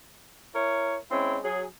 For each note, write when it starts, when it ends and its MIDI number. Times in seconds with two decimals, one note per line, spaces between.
0.54 0.96 64
0.54 0.96 70
0.54 0.96 73
1.10 1.38 56
1.10 1.38 60
1.10 1.38 61
1.10 1.38 64
1.43 1.65 54
1.43 1.65 68